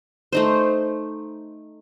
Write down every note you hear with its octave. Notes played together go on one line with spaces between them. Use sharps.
A3 D#4 C5